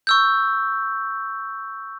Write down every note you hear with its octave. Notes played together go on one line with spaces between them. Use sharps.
C#6 E6 G6